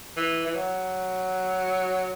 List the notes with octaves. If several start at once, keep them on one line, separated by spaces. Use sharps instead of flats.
E3
E3
F#3